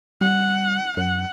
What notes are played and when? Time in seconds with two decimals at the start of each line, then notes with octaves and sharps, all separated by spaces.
0.21 G3 F#5
0.97 F#2 F#5